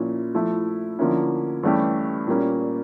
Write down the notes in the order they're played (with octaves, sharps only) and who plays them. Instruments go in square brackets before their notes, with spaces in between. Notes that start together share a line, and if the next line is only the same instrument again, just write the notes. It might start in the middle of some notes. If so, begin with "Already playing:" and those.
Already playing: [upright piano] A#2 F3 C#4 E4
F3 A3 E4
D3 F3 A#3 C#4 E4
G2 E3 A3 C#4 G4
A#2 G3 A#3 C#4